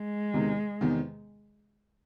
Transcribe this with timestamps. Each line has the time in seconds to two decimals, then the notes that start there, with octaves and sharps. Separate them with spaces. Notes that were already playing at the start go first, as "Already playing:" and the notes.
Already playing: G#3
0.34 E2 C3 D#3
0.81 E2 C3 D#3